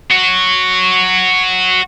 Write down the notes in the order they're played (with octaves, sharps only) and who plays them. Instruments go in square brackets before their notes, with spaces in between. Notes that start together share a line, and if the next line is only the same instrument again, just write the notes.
[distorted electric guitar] F#4 C#5